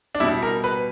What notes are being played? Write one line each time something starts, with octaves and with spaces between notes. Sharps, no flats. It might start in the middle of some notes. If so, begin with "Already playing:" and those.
D4
B2 G3 E4
A#4
B4